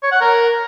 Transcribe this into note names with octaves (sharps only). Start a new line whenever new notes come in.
C#5
F#5
A#4